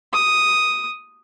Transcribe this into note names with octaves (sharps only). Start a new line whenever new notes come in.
D#6